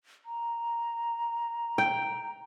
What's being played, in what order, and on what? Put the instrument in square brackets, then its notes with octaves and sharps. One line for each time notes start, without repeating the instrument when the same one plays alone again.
[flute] A#5
[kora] G5